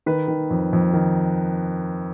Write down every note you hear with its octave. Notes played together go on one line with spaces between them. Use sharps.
D#3 B4
D#3
F2
F2
D#3